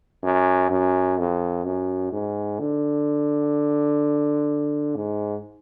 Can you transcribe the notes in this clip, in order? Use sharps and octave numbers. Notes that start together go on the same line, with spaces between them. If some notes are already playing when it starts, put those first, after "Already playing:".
F#2
F#2
F2
F#2
G#2
D3
G#2